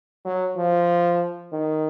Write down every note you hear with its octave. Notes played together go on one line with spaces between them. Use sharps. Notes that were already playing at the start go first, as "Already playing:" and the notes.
F#3
F3
D#3